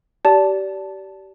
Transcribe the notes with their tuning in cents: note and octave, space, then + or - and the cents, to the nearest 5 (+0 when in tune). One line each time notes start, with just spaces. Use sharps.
G4 -25 D5 -20 A5 +0